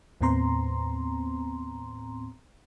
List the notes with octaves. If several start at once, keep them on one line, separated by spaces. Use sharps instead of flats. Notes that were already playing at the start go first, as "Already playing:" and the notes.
D#2 A2 B3 C4 A#5 C6